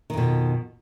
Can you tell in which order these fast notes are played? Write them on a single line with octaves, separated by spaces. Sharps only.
D#3 F2 B2